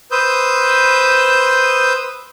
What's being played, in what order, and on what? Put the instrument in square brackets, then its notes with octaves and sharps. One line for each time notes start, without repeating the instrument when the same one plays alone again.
[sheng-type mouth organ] B4 C5 D#6 E6 G6